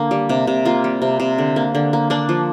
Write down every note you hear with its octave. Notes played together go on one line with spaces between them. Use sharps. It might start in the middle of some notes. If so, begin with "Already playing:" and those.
Already playing: D3 A#3
G3
C3
C3
A#3 F4
G3
C3
C3
D3
A#3
D3
A#3
A#3 D4
F3